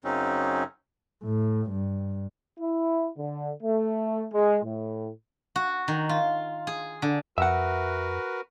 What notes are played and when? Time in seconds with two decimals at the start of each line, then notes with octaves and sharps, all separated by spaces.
0.04 F#2 C#3 F#3 C4 C#4 D#4
1.24 A2
1.70 G2
2.60 E4
3.18 D3
3.62 A3
4.32 G#3
4.63 A2
5.56 F#4
5.88 D#3
6.09 F4
6.67 G#4
7.02 D3
7.38 F2 F#4 A#4 B4 E5 F#5